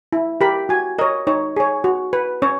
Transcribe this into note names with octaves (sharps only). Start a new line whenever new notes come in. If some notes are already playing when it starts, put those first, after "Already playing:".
E4
G4 A#4 B5
F#4 G#5
A#4 C#5 D#5
D#4 C#5
G#4 C#5
F#4
B4
C#4 C#5